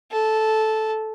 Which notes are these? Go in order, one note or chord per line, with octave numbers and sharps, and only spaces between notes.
A4